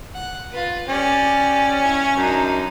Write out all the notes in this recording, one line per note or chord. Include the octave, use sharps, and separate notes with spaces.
F#5
F4 B4
C#4 G4 D5
E4 C#5
F#2 D4 D#4